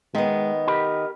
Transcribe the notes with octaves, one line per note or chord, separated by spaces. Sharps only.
D#3 G#3 B3
G4 A#4 B5